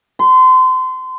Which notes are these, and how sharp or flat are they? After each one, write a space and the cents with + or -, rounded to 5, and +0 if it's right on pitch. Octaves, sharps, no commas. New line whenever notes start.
C6 -30